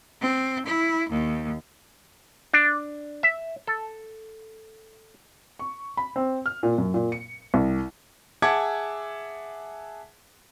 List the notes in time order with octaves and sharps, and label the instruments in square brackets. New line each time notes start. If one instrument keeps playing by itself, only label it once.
[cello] C4
E4
D#2
[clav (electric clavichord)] D4
E5
A4
[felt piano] C#6
B5
C4
F6
A#2
F#2
A#2
C#7
C2
[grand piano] G#4 E5 F#5 A5 D6 G#6